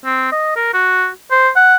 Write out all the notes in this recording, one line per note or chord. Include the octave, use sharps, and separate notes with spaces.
C4
D#5
A#4
F#4
C5
F#5